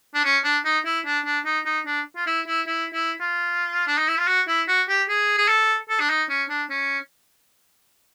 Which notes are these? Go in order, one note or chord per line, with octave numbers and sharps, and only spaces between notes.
D4
C#4
D4
D#4
E4
D4
D4
D#4
D#4
D4
F4
E4
E4
E4
E4
F4
D4
D#4
E4
F4
F#4
E4
F#4
G4
G#4
G#4
A4
A4
D4
D#4
C#4
D4
C#4